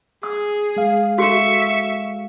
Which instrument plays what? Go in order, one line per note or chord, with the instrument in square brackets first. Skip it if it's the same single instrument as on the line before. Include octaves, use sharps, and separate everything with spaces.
[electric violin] G#4 [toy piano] D#6
[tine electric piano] G#3 F5
[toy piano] F#4 A4 [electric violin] E5 C#6